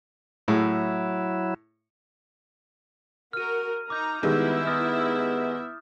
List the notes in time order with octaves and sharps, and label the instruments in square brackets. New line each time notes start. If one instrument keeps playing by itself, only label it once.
[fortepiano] A2 G#4 [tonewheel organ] F#3 E4
[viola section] F#4 A#4 [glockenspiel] F6 D#7
[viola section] D#4 A#5 [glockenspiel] D6 G6
[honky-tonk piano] D#3 G3 G#3 [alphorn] B3 [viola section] E4 E5 [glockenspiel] G6
[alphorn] B3 [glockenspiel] D#6 F6 A6